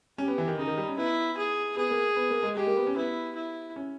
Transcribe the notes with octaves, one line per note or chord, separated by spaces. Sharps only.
C#4 G4
B3
E3
D#3
C#3 D#4
D#3
G3
C#4
B3 E4
G#4
B3 G#4
A#3
B3
A#3
G#3
G#3 G4
A#3
B3
C#4
B3 E4
E4
C#4